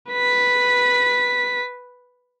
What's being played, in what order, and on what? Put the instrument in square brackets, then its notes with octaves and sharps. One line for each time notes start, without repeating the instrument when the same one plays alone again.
[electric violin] B4 B6